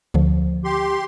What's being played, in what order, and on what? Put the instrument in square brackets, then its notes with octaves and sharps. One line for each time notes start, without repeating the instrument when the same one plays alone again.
[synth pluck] D2 D3 F3
[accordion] G4 C6